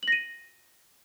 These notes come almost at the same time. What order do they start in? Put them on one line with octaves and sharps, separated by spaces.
F#7 A#6 D#7